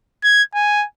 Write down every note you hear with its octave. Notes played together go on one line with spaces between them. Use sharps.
G#6
G#5